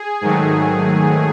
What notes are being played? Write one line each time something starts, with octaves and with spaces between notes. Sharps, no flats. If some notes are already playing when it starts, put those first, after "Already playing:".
Already playing: G#4
G#2 D#3 F#3 A3